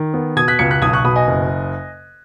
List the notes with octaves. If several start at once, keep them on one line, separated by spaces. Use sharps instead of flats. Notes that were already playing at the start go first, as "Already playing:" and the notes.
Already playing: D#3
B3
B2 D#6 G#6
F#6 B6
C#2 G#6 C#7
F#6 B6
B1 D#6 G#6
C#6 F#6
B2 B5 D#6
D#5 G#5
F#1